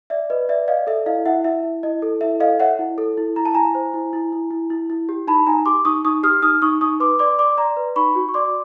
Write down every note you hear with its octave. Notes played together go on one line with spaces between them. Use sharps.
D5 E5
B4 D#5
D5 E5
D5 D#5 F5
A4 E5
E4 D#5 F5
E4 E5 F#5
E4 E5
E4
E4 D#5
A4
E4 E5
A4 D#5 F5
C#5 E5 F#5
E4
A4
E4
E4 A#5
A5
E4 G#5 A#5
C5
E4
E4
E4
E4
E4
E4
G4
D#4 A5 B5
D#4 G#5 A#5
G4 C6 D6
D#4 C#6 D#6
D#4 C#6 D#6
G4 D#6 F6
D#4 D#6 F6
D#4 C#6 D#6
D#4 C#6 D#6
B4 C6 D6
D5 C6 D6
D5 C6 D6
D5 A#5 C6
B4
D#4 B5 C#6
F#4
C#6
D5 C6 D6